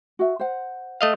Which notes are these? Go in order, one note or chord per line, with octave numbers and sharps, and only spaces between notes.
F#4 E5
C5 F#5
A3 D#5 F5